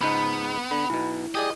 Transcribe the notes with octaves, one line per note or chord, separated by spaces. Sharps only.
C#2 G#2 B3 D#4 B5
D3 B5
B1 B2 E4
G4 G#4 D5 D#5